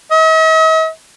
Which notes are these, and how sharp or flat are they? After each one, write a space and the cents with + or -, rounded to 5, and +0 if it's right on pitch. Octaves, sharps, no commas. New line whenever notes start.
D#5 +45